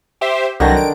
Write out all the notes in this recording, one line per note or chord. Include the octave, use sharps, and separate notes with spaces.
G4 C5 E5
C2 D3 D#3 F#3 A#6
D7